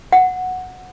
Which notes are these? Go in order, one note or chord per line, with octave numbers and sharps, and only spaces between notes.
F#5